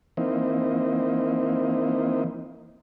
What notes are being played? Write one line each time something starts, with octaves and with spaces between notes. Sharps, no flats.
E3 A#3 C4 D#4